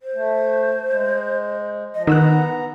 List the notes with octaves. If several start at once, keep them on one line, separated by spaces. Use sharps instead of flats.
C5
A3
G#3
F3 D#5
D#3 B3 F#5 A#5 E6 F#6